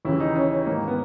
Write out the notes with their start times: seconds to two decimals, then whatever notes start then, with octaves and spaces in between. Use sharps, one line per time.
0.05 D#2 C#3 E3 E4
0.20 D#4
0.35 C#4
0.67 G#2 D#3 A#3
0.88 B3